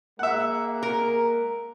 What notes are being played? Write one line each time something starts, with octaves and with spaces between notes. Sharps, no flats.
G#3 A#3 E5 F#5
A#4